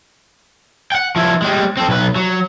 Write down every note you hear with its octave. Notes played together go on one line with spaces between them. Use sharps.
F#5 G5
F3 E4
G3 G#3
C4 A4
B1 B4
F#3